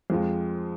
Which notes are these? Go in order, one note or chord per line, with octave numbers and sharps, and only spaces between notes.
F2 F3 G#3 F4